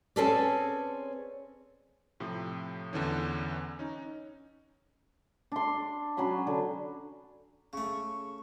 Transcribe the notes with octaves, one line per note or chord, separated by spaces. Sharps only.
C4 C#4 G#4 A4 B4 D5
A2 C3 F3
E2 D3 E3 C#4
C#4 D#4
D4 C6
F#3 C#4 B5 C6
D3
C#3 A3 C#6